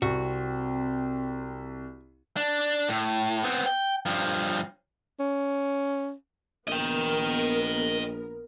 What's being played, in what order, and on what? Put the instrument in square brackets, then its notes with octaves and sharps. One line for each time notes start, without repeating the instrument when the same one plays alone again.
[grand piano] C2 [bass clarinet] C4 [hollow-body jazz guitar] F#4
[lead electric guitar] D4
A2
B3 C4
G5
G2 F3
[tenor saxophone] C#4
[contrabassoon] A#1 [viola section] B3 A#4 [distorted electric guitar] D#5 G5